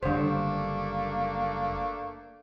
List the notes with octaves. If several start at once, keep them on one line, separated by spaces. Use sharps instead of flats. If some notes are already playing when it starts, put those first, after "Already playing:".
F#1 D3 G3 A3 D4 C5
A#3